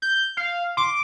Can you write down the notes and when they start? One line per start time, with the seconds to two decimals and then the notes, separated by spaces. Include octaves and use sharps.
0.02 G6
0.37 F5
0.77 C6 D6